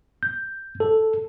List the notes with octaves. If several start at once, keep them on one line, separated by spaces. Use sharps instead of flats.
G6
A4